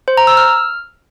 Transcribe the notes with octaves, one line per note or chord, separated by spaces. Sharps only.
C5
A#5
E6
F6